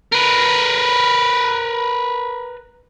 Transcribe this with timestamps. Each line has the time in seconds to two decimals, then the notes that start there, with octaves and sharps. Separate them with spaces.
0.13 A#4 B4